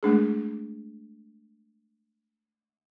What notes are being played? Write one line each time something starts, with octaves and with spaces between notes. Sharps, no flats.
G#3 A3 D4 G#4